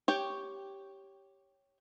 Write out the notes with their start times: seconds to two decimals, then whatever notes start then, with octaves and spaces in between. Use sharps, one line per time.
0.08 G4 C#5 G5